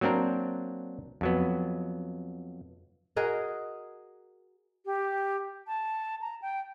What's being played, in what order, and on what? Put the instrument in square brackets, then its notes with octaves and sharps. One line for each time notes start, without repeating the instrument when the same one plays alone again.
[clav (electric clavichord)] F#3 A#3 C4 D4 A#4
F2 F#3 B3
[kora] F#4 G#4 A#4 D#5
[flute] G4
A5
A#5
G5